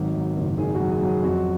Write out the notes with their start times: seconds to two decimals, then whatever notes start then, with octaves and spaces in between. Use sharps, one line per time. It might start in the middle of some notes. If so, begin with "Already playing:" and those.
Already playing: G#1 D#3 F#3
0.15 F#3
0.37 F#1
0.58 D#3 G#4
0.74 F#4
0.80 F#3
0.91 G#4
1.02 F#3 G#4
1.23 F2 F#4